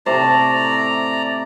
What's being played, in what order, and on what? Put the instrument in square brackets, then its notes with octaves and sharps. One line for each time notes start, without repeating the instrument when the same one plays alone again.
[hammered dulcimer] A2 C3 A3 [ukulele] C5 [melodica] D5 A#5